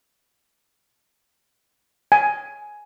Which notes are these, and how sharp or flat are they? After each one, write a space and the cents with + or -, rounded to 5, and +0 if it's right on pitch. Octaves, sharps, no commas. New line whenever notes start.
G#5 +10